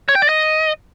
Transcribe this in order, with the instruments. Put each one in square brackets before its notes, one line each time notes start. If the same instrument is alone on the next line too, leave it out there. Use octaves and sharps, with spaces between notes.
[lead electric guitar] C#5
G5
D5
D#5